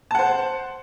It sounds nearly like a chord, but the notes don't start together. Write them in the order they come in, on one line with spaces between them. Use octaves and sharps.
A5 F#5 C5